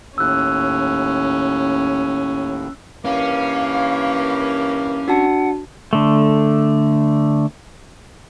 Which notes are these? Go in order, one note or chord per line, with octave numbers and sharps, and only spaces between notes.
D#2 A2 C#4 E6 F#6
G2 E3 A#3 C#4 F5
D4 F#4 F#5 A5
D3 A3